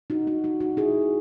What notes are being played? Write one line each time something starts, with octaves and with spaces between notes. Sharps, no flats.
D#4 F#4
D#4 F#4
D#4 F#4
D#4 F#4
E4 G#4